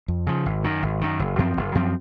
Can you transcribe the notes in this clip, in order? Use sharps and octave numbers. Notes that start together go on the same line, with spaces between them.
F2
C#3 F3
G#1
F#2 D#3
G#1
F#2 D#3
F#1
F#2 F3 C4
F#1
F#2 F3 C4